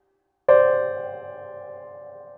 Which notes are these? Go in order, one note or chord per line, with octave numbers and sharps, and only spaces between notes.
C5 D5